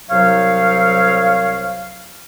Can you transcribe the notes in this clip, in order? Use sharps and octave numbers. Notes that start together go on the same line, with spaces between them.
C2 F#3 C5 C#5 F5